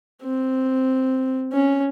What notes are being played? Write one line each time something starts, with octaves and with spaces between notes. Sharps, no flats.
C4
C#4